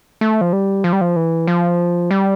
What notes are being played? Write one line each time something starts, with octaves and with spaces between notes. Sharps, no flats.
A3
F3
G3
F3
G3
F3
E3
F3
G3